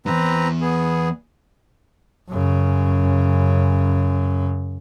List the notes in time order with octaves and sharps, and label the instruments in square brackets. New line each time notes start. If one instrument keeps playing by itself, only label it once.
[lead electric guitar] E2 G2 [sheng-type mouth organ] C4 B4 A#5
[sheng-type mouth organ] B3 G#4
[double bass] F#2 C#3